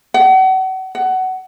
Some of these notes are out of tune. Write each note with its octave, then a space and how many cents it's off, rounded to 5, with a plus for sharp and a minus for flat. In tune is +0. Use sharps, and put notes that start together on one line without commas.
F#5 +35
F#5 +20